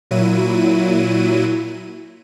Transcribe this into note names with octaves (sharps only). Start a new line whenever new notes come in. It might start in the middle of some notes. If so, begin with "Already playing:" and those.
A#2 F#3 E4 D#7